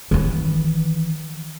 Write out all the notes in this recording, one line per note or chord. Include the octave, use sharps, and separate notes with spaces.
D#3 E3